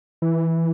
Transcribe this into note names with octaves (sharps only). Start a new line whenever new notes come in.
E3